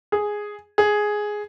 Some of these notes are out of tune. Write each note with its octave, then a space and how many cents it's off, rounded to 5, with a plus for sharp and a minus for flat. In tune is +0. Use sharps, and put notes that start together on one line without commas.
G#4 +0
G#4 +5